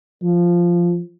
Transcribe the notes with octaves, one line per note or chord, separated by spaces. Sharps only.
F3